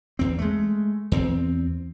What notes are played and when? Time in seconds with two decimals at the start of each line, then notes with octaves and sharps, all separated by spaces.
0.19 E2 C4
0.38 G#3 A3
1.12 E2 C4